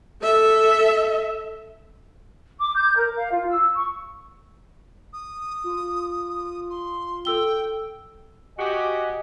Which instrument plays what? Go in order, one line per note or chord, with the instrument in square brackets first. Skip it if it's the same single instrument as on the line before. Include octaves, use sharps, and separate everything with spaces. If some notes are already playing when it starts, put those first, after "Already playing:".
[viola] A4 E5
[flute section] D6
G6
A#4
F5
F4
E6
C#6
[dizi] D#6
[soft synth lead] F4
[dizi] C6
[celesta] A4 E6 G7 [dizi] G5
[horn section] F#4 G4 [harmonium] D#5 G#5